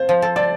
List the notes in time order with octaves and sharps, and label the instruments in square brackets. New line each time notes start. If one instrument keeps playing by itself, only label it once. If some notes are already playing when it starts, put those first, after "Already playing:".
Already playing: [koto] C4 F4 [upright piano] C5
[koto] F3
A4
[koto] A4 [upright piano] D5